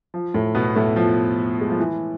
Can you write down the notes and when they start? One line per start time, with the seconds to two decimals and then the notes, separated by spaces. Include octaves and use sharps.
0.14 F3
0.34 A2 A3
0.55 B2 B3
0.76 A2 A3
0.96 F3
1.61 G#3
1.70 F3
1.79 E3